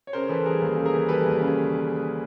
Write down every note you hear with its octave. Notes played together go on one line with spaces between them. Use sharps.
C#5
C#3 A#4 C5
E3 A4 B4
G3 G#4 A#4
D#2 A#4
C#3 A4
G#4 A#4
E3
G3 A4 B4
D#2
C#3